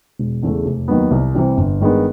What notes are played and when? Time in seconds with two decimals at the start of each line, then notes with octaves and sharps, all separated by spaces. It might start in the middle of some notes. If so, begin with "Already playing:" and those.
0.19 E1
0.43 E2 C#3 E3 A3
0.65 F1
0.88 D#2 D#3 F#3 B3
1.11 C2
1.35 C3 E3 G3
1.57 G1
1.80 G2 D#3 G#3 B3